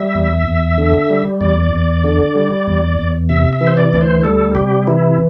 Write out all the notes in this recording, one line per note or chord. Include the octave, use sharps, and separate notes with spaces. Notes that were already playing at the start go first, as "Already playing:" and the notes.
Already playing: G3 E5
E2
E2
D3
G3
E2 D5
E2
D3
G3
E2
E2
C3 E5
E5
E3
C5
D5
D2
C5
G3 A4
C3 G4
E3 E4